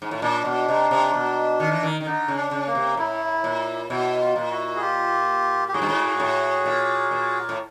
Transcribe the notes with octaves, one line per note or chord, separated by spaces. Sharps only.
G#2
A2
A#2 D4
B2
C3
C3
B2
D#3
E3
D#3
D#3
D3 D#4
C#3
D4
C#3
A#3
C3
A2 E4
A#2
B2 E4
F4
A#2
E4 F#4
G#4
F4 G4
G4
G#2 F#4 G#4
G2
G#2
A2
A#2
A#2
A2